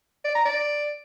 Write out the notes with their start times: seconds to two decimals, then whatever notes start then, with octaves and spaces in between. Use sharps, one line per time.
0.25 D5
0.35 A#5
0.45 D5